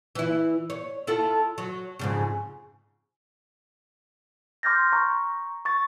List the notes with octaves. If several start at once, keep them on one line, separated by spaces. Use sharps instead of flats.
E3 E4
C#5
E4 F4 A4
F#3
F2 G#2 C#3
C6 D6 F6 G6 A6 A#6
A#5 C#6
C#6 A6